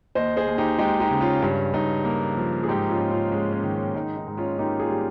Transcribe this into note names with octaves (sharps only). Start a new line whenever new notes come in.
D#2 C5 D#5
G#4 C5
D#2
D#4 G4
G#3 D#4 G4
D#4 G4
C#3
C#4 F4
G2 C#4
G2 D#4
A#3
F3
G#4
G#2 D#4 G4
C#4 F4
G#2
C#4 F4
G#3 C#4
C#4
D#3
C#4
G#2 D#4
D#4
G#2
C#4 F4
A#3 D#4 G4
F4 G#4
G3